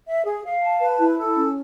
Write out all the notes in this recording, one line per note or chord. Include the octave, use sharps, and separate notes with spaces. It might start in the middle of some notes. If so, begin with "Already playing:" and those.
E5
G#4
F5
A5
B4
E4
A4
C#4